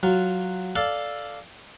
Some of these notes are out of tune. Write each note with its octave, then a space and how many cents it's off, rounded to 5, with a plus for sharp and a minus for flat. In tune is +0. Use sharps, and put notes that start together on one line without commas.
F#3 +0 F4 +0
A4 +0 D5 +0 F5 +0